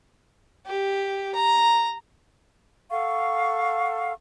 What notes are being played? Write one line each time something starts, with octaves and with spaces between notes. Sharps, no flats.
G4
A#5
A4 F5 F#5 C#6